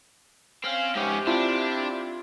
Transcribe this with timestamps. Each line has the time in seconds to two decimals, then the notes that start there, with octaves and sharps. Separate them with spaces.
0.64 C4 C#4 F5
0.95 G#2 C3 C#4 G4
1.27 C4 D4 E4 F4